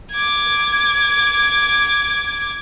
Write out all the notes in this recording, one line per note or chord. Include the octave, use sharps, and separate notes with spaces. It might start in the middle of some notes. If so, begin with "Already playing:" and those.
D6 G#6